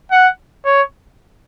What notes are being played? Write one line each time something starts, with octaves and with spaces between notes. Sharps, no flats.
F#5
C#5